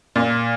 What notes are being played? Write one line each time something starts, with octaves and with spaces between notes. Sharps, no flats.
A#2